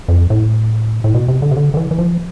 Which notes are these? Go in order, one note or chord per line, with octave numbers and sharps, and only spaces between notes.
F2
A2
A2
B2
C3
D3
C3
D3
D3
E3
E3
F3